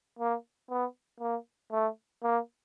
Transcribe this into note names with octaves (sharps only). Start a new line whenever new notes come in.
A#3
B3
A#3
A3
A#3